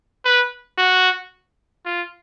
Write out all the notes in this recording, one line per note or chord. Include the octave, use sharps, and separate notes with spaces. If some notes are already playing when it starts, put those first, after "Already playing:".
B4
F#4
F4